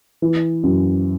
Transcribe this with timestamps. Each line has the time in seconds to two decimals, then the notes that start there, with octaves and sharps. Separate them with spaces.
0.22 E3
0.63 F#2